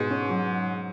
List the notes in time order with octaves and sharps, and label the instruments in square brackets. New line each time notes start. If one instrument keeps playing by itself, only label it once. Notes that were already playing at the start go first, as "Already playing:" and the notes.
Already playing: [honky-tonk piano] G#2 [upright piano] B2 G#3 B3
[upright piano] C#4
F#3